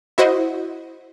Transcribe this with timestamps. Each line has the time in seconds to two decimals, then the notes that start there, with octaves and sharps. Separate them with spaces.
0.18 E4 F#4 C5 D#5